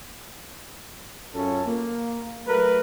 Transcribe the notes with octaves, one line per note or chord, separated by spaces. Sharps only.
F#2 C#4 F4 A4
A#3
F#3 A3 A#4 B4